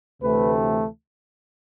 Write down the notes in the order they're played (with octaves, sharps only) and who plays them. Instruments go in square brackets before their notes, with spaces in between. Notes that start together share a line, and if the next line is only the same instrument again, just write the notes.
[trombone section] D2 C3 E3 A3 C4 B4